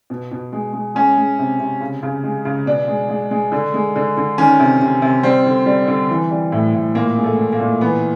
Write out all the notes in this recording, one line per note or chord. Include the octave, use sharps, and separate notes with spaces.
B2
B2
G#3
G#3
G#3 C#4
G#3
C3
C3
C#3
C#3
G#3
C#3
B2 D4
G#3
G#3
G#3
D3
G#3
D3
D3
D#3 C#4
C3
C3
C3
G3 C4
D3
G3
D3
E3
G3
A2
A2
A#2 A#3
G#3
A3
A#2
A#3
A#2
E3 B3